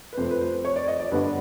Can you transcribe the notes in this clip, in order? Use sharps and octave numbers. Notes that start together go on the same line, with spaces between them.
B4
F2 C3 F3 A3 C5
B4
C5
C#5
D5
D#5
D5
G2 D3 G3 B3 B4